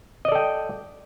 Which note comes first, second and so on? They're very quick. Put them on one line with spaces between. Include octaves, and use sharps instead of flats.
D#5 D5 A4 G5